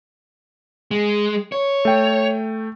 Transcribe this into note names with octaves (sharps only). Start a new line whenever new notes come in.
G#3
C#5
A3 G5